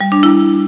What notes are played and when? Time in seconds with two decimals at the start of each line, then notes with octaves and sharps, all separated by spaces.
0.01 G3
0.12 D4
0.23 E4